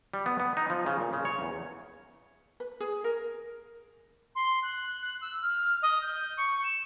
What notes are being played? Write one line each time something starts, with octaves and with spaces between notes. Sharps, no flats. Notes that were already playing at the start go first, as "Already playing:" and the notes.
G3
B3
B3
D#4
F3
C#3
A#2
C#3
C#5
E2
B4
G#4
A#4
C6
F#6
F#6
E6
F6
D#5
G6
C#6
E7